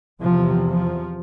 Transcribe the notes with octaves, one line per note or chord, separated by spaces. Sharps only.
E2 C3 F3
F3